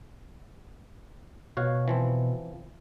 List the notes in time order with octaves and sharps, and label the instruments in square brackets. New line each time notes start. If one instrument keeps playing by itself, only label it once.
[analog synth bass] B2 [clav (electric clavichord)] F#4 C#5 F5
[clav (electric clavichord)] E3 F3 C4